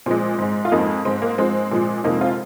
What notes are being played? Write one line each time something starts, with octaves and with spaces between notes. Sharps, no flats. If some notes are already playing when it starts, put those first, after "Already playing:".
A#2 F3 G#3 C4
G#2 G#3
F4
F2 F3 G#3 A#3 D#4
G#2 G#3 C4
A#3
G#2 F3 G#3 C4
A#2 F3 G#3
F2 C3 F3 G#3 A#3 D#4
C4 F4